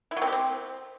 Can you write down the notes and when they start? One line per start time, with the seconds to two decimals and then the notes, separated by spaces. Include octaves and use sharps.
0.11 E4
0.16 F#3
0.22 C4
0.27 G4
0.32 C4